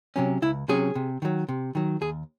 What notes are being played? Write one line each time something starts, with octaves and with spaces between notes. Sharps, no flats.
C3 F#3 C#4
C#2 E4
C3 F#3 C#4 G#4
C3
D#3 F#3
C3
D#3 F#3
D#2 G#4